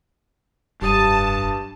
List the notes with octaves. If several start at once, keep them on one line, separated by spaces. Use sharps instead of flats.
F1 G2 G4 A5 D#6 D#7